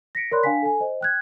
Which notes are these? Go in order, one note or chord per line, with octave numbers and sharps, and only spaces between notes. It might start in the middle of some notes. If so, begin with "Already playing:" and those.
A#6 B6 C#7 D7
A#4 C#5 D5 B5 C6 F#6
D4 F5 G5 G#5 B6
A4 G#5
C5 D#5
G5 F#6 G#6